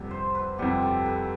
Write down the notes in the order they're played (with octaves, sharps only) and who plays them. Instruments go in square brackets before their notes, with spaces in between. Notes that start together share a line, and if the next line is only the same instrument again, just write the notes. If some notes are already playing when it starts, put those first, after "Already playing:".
Already playing: [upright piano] F2 C3 G3 B3
[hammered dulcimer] C5
B4
[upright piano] F2 C3 G3 B3 [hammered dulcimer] G4
[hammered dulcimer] A4
B4